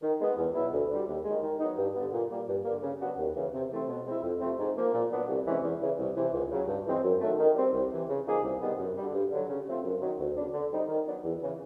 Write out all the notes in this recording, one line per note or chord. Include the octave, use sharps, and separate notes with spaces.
D#3
G#3 B3
E2
B2 F#3 B3 E4
D2
D3 G3
D#2
D#3 G#3
D#3
F#3 B3 D#4
G2
D3 G3 B3
A#2
G3 A#3
G2
D3 G3 A#3
C#3
F#3 B3 D4 F#4
D#2
C#3 E3
C3
E3 A3 C4
B2
G#3 C4 E4
F2
C3 F3 A3 C4
G#2
F3 A#3
A#2
F#3 B3 D4
C2
C3 E3 G#3 C#4
E2
C#3 E3
C2
C3 E3
C#2
C#3 F#3
G2
E3 G#3 C4
F#2
D#3 F#3 A3
D#3
G3 C4
C2
C3 E3
C#3
F3 A#3 D#4 G#4
C2
C3 D#3 G3 B3
F#2
D3 G3
G2
D3 F#3
C#3
F3 A3 C4 F4
F#2
D#3 F#3
D2
C#3 F#3 B3 D4
D3
G3 C4 D#4
D#3
F#3 B3 D4
E2
C#3 E3